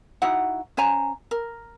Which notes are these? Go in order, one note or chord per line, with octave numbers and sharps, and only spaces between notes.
D#4 E4 F#4 F#5
C#4 C5 G#5 A#5
A#4